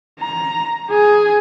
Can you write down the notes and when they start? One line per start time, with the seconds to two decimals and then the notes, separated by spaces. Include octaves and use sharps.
0.20 A#5
0.89 G#4